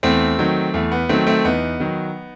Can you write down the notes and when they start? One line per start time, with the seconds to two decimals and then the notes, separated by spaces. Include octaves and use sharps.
0.03 E2 A3 C4
0.39 D#3 F#3
0.74 E2 A3
0.92 B3
1.09 D#3 F#3 A3 C4
1.27 A3 C4
1.44 E2 B3 D#4
1.80 D#3 F#3